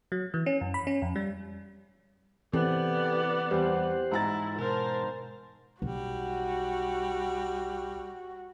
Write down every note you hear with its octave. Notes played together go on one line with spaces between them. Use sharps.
F#3
E3
C#4
F#2
B5
C#4
F2
G3
E3 B3 C4 G4 A4 D5
E2 G3 G4 C5 F#5
G#2 E4 A#5 A6
B2 A#4 C5 A5
B1 G3 F#4